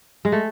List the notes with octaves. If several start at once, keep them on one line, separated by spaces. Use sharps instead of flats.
G#3
A3